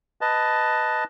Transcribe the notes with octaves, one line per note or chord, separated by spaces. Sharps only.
B4 D#5 A5